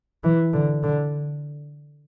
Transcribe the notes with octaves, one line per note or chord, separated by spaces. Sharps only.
E3
D3
D3